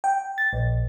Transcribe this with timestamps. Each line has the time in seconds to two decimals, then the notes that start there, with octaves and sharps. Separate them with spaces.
0.04 G5
0.38 A6
0.53 A#1